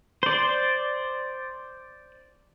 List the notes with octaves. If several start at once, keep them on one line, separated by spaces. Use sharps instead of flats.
C5 D5